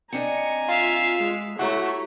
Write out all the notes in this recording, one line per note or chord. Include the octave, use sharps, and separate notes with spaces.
C4 D4 D#5 G#5 A#5 C#7
F4 E5 F5
G#3
A3 E4 F#4 G4 C#5 E5 A#5